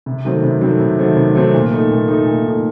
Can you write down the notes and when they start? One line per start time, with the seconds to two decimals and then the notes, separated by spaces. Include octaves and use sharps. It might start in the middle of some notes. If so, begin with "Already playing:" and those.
0.06 C3
0.25 D#3 F#3 A3 C4
0.43 C3
0.61 D#3 F#3 A3 C4
0.80 C3
0.99 D#3 F#3 A3 C4
1.16 C3
1.35 D#3 F#3 A3 C4
1.54 A#2
1.71 A3 D#4
1.91 A#2
2.08 A3 D#4
2.26 A#2
2.45 A3 D#4